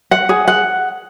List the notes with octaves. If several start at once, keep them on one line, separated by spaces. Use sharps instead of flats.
F#5
G#4
F#5